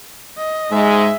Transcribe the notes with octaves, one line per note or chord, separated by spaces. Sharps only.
D#5
G#2 G#3 E5